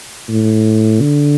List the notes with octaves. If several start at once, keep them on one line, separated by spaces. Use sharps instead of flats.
A2
D3